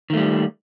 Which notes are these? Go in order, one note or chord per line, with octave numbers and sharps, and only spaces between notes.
D#3 G3 A3